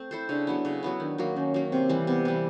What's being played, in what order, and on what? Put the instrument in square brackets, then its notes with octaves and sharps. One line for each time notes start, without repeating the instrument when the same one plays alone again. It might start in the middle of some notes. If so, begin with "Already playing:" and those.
Already playing: [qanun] A3 C4
E4 A4 C5
[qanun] C#3 [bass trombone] D4
[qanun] F#3 B3 E4
C#3
F#3 B3 E4
[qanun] D#3 [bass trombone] D4
[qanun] F#3 A#3
[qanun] D#3 [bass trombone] C#4
[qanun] F#3 A#3
[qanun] C3 [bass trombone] C4
[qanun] E3 G3
[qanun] C3 [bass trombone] B3
[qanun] E3 G3